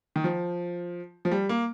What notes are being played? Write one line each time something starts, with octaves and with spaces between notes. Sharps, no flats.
D#3
F3
F3
G3
A#3